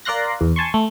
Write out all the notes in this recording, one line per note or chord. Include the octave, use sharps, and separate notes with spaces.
A#4 D5 F5 C6 F#6 A#6
E2
G#5 A5 C6 C#6
A3